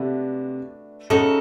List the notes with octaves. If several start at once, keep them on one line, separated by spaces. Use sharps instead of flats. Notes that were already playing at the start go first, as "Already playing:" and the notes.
Already playing: C3 A3 D4 F#4 B4
C#3 D#4 F#4 A4